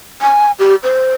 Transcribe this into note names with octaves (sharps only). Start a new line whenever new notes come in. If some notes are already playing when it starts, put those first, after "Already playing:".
G#5
G4
C5